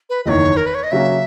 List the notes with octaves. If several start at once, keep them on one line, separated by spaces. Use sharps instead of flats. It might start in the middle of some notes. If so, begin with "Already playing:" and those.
B4
F#1 E2 D#3 C#5 D#5
A#4
B4
C#5
D#5
C#3 F#3 A#3 C#4 E5